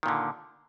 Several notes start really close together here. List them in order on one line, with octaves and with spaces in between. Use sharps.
D#3 A#2 D3